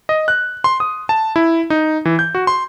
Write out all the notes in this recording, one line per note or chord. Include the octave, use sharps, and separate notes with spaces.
D#5
F#6
C6
D#6
A5
E4
D#4
E3
G6
F#4
C6